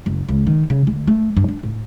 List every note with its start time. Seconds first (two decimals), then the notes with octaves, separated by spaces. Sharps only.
0.06 F#1
0.29 C#2
0.47 D#3
0.70 C#3
0.87 D2
1.07 A3
1.37 G2
1.49 D4
1.63 A2